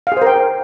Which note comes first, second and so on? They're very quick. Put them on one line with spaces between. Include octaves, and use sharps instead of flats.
F5 G#4 C5 A#4 G5